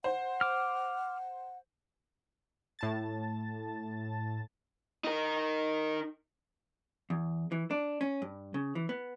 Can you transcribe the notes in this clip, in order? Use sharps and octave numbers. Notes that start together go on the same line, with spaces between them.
C5 F#5
D6 F6
A2 A5 A6
D#4 A#4
E2
E3
D4
C#4
G2
C#3
E3
B3